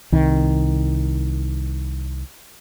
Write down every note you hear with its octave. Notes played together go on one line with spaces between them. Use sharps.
C2 D#3